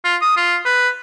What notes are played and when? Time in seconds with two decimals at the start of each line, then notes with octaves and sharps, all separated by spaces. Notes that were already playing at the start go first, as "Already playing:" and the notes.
0.05 F4
0.22 D#6
0.37 F4
0.66 B4